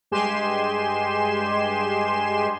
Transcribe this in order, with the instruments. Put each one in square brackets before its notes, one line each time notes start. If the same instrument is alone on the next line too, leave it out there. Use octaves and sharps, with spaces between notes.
[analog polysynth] G2 G#3 G4 G#5 C6 E7